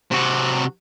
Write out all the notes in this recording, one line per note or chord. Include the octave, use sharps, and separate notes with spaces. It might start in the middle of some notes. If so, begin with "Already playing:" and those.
C3 F#4